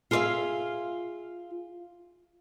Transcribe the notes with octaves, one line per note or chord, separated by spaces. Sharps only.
F4 G#4 A#4 D5 E5 F5